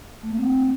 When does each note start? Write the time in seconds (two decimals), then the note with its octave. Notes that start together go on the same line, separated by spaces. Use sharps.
0.23 A3
0.30 A#3
0.37 C4